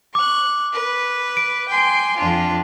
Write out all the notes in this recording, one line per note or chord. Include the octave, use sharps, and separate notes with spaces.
C#6 D6 F#6
B4
D7
G5 G#5 C6
F2 D4 F4